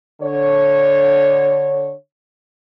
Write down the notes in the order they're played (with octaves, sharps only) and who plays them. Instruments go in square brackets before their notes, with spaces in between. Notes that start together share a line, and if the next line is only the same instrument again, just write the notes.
[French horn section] D3 C#5